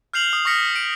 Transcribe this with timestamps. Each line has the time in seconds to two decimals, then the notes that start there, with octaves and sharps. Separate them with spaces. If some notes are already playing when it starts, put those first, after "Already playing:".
0.14 F6 G6 C7 F7 F#7
0.33 D#6
0.45 C#6 D#6 F6 A#6 B6 C#7
0.76 D7